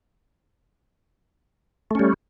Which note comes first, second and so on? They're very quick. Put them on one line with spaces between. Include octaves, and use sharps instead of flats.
A3 C#4 G3